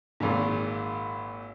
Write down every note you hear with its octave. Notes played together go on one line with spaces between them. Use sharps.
G#1 A#2